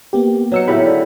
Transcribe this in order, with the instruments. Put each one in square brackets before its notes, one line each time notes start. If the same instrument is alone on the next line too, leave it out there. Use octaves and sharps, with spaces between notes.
[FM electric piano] A#3 B3 G4
[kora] F#3 D#4 F#4 [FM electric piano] B3 E6 C#7
[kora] A2 C#3 G4 [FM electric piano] E5 F#5 B5
[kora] D3